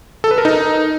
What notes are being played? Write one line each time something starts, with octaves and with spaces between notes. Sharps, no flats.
A4
B4
A#4
D#4